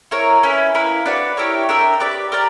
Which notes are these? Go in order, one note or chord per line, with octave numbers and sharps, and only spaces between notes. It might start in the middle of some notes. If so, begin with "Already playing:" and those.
E4 A#4 C#5
C#4 E4 B4
A#3 E4 B4
D4 F#4 B4 D5
E4 G4 A#4 C#5
D4 A#4 E5 G5
G4 B4 D5
G4 A#4 D5